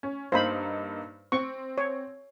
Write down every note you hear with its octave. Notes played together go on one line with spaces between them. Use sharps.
C#4
G2 A#3 D#4 C5 F5 B5
C4 C#6
C#5